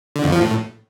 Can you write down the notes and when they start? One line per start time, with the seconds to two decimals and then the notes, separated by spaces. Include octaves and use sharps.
0.16 D3
0.24 F2
0.32 F3
0.40 A2